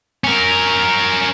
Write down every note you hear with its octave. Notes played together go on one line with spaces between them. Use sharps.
C#4 A#4